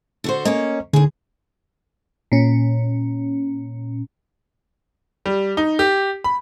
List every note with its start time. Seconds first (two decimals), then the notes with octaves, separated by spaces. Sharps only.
0.24 D3 F#4 C5
0.45 A#3 C#4 C#5 D#5
0.93 D#2 D3 G#4
2.32 A#2 C#4
5.26 G3
5.57 D#4
5.79 G4
6.24 B5